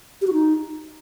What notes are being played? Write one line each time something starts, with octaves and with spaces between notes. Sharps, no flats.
G4
F#4
D#4